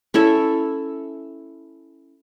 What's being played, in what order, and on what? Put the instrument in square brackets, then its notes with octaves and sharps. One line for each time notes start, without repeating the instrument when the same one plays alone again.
[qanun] C#4 E4 A4 E5